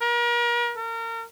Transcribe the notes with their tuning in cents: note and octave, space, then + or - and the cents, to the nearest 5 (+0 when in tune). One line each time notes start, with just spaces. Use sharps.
A#4 +40
A#4 -30